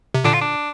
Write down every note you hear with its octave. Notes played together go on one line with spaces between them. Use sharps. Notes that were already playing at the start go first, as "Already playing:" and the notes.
C3
A#2 D3 D4
F4
D4